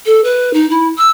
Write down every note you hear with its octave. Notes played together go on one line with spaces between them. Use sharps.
A4
B4
D#4
E4
E6